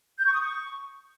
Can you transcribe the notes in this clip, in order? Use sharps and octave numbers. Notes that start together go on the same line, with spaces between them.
G6
C#6
D#6
C#6